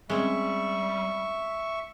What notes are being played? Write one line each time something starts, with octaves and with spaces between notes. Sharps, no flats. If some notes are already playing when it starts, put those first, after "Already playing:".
G3 G#3 C4 C#4 E5 C#6